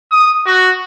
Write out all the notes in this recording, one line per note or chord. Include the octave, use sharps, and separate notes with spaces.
D#6
F#4